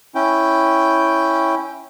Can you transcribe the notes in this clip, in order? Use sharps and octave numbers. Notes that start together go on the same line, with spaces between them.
C#4 E4 G5